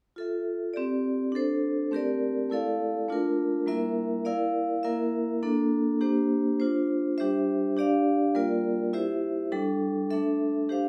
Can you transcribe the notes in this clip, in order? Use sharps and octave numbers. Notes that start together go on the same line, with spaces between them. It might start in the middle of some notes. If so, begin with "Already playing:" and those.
F4 A4 E5
C4 G4 D5
D4 A4 C5
A3 C4 G4 A#4 D5
A3 E4 A4 D5 F5
A3 D4 F4 A#4
G3 A#3 E4 A#4 E5
E4 A#4 D5 F5
A#3 E4 A#4 E5
A#3 D4 A4
A#3 D4 G4 C5
D4 F4 C5
G3 D4 G4 C5 E5
D4 G4 D5 F5
G3 A#3 F4 A#4 D5
E4 G4 C5 E5
G3 D4 A4
A3 D4 A4 E5
D4 G4 C5 F5